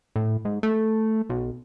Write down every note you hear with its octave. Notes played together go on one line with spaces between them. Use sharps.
A2
G#2
A3
B1